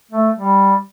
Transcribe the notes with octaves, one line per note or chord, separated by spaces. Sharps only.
A3
G3